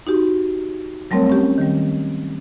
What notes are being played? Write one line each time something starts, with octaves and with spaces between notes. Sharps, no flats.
D#4 F#4 G4
F#3 G3 A3 C4 A#4 C#5
C#4 G4
D#3 G3